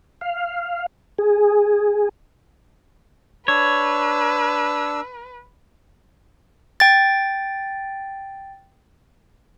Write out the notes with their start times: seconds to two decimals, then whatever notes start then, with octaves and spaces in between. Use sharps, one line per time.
0.21 F5
1.18 G#4
3.48 D4 B4 C#5 E6
6.80 G5 A6